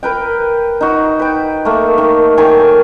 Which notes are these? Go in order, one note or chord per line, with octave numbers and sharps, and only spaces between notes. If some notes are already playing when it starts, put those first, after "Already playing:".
A#4 B4 G5
D#4 F#4
B4 G5
A3 A#3
D#3
D#3 F#3 G4 G#5